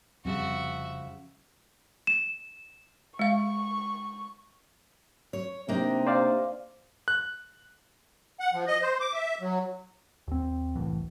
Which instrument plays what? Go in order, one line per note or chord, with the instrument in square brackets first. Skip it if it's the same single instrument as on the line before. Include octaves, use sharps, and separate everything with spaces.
[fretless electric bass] F1 F2 C4 [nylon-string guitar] C#3 F3 G3 [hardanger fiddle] F#4 E5
[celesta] E7
[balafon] G#3 F5 [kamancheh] C#6
[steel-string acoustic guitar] C#5
[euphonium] C3 [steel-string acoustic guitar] A#3 D4 D#4
[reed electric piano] C5 D5 F5
[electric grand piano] F#6
[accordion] F#5
F3
D#5
C5
D6
E5
F#3
[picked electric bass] D#2 C4
E1 C2 A2 E3